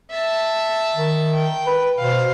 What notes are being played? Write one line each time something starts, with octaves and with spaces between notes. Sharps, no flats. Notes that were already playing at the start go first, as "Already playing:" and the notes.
E5 A5
D#3
G5
B4
B2 C5 F5